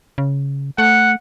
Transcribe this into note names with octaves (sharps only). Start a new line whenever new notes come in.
C#3
A3 F#5